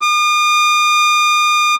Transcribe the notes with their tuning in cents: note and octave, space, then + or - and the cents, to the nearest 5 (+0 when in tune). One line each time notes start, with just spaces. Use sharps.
D#6 -45